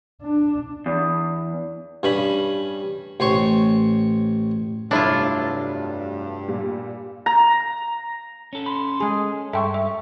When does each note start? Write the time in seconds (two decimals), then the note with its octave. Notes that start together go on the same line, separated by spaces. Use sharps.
0.22 D4
0.86 E2
2.03 G2 C#4 B5
3.20 A1 C5 C#5 C#6
4.91 F1 G2 F#3 A3 D4 E4 F4
6.48 A#2 G3
7.26 A#5
8.53 C#4 A4
8.66 B5 C6
9.00 G#3 G#4
9.53 G2 A4 E5 G5 C6 C#6
9.74 E5 C#6